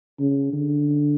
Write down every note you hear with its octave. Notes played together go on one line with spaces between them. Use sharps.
C#3
D3